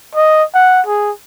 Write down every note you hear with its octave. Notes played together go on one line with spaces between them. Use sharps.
D#5
F#5
G#4